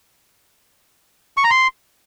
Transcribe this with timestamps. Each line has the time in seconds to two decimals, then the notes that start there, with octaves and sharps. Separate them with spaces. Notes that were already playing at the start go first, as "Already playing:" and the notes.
1.37 C#6
1.44 A#5
1.50 C6